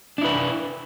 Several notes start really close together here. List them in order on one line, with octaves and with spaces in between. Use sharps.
D4 E4 B4